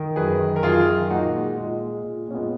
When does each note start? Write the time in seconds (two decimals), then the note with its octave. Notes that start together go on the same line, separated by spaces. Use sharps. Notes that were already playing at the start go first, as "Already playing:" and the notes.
Already playing: D#3
0.16 F#2 G#4 B4
0.40 D#3
0.56 A#4
0.63 F#2 F4 G#4
0.87 D#3
1.10 A#2 D#4 F#4
1.33 G#3
1.56 A#2 G#3
1.80 G#3
2.03 A#2
2.28 A#2 C#4
2.35 G#3 B3